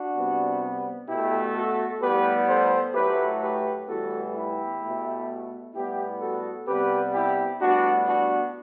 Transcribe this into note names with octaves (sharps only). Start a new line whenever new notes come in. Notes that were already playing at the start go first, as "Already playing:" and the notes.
Already playing: D4 F#4
C3 G3 B3
B2 A3 E4 G4
F#4 A4
A2 G3 B3 G4 B4
A4 C5
A2 F#3 A3 G4 B4
G4 B4
A2 E3 G3 B3 F#4 A4
E4 G4
B2 A3
A2 G3 B3 E4 G4
F#4 A4
C3 G3 B3 G4 B4
E4 G4
A2 G3 B3 D4 F#4
D4 F#4